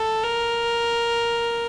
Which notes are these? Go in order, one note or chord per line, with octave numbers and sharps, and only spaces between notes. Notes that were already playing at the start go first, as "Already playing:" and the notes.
Already playing: A4
A#4